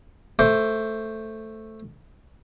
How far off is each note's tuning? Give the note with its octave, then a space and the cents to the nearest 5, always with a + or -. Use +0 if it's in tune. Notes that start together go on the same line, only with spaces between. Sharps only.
A3 +0 C5 +0 D6 -45